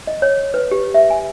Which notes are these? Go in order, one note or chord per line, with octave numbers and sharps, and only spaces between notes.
D#5
C#5
B4
G4
E5
G#5